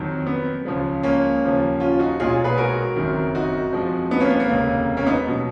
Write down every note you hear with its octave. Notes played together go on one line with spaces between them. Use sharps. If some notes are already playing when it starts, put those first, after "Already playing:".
Already playing: F2 D#3 F#3
B3
C#2 C#3 F3 G#3
A#3 C#4
D#2 C#3 F3
C#4 F4
D#4 F#4
B1 A#2 G#3 F4 G#4
G#4 B4
F#4 A#4
F#1 F2 D#3 F#3
D#4 F#4
F2 F3 G#3
B3 D#4
A#3 C#4
B3
A#3
F1 D#2 C#3 G#3
A#3 C#4
B3 D#4
B2 F#3